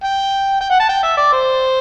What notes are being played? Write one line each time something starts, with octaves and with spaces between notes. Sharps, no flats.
G5
G5
F#5
A5
G5
E5
D5
C5